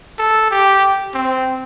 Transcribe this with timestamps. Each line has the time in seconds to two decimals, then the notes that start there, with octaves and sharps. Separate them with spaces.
0.19 A4
0.51 G4
1.14 C4